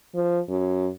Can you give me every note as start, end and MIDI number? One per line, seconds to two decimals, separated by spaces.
0.15 0.39 53
0.49 0.89 42